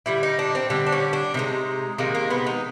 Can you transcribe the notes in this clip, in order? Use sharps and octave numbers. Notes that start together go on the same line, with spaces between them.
D3 G3 E4
D#4
D4
C4
D3 G3 C4
D4
C#4
D4
C3 D#3 G#3 D#4
C3 D#3 G#3 A#3
A#3
B3
D#4